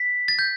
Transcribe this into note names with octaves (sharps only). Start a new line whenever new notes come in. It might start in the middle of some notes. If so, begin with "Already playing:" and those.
Already playing: B6
A6
G6